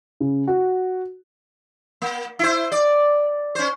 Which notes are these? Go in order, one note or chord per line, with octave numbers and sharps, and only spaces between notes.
C#3
F#4
A#3
E4 C5
D5
C#4 C5